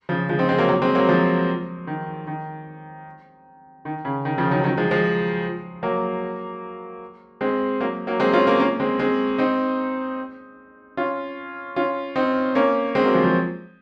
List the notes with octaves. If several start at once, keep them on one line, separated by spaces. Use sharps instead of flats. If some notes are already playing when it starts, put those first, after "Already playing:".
C#3 F3
F3 G#3
C4 D#4
G#3 C4
F#3 A#3
F#3 A#3
G#3 C4
F#3 A#3
F3 G#3
D#3
D#3
D#3
C#3
D#3
C#3 F3
D#3 F#3
D#3 F#3
F3 G#3
F3 G#3
F#3 A#3
G#3 C4
F#3 A#3
F#3 A#3
G#3 C4
C#4 F4
A#3 C#4
A#3 C#4
G#3 C4
G#3 C4
C4 D#4
C#4 F4
C#4 F4
C4 D#4
A#3 C#4
G#3 C4
F#3 A#3
F3 G#3
F3 G#3